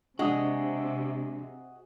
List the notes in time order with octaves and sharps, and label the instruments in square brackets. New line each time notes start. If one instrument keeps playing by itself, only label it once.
[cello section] C3 [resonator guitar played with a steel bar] G#3 [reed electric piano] D4 [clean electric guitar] F#4 G#4 D#5